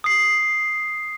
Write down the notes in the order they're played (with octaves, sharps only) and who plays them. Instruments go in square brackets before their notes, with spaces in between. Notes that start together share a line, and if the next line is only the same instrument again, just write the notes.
[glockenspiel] D#6 C7